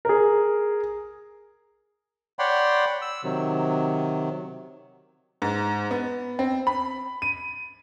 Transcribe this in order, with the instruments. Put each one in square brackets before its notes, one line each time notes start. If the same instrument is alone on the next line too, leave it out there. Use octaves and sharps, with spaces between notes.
[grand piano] G#4 A#4
[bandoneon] C#5 D5 F#5 G5 B5 C6
E6
C3 D#3 F#3
[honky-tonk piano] G#2
B3
C4
B5
D#7